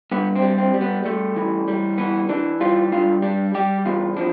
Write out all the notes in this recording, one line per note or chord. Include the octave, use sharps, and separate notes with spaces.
G2 B3
C4
G3
C4
G3
B3
G3 A3
E3
G3
E3 B3
E3 D4
G3 F4
G2 F4
G3 D4
G3 G4
E2 F4
F3 D4